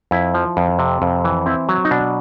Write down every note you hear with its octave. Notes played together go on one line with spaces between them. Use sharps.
F2 E4
F3
F2
C3
F2
E3
C4 E4
F#3
D#4
B2 D4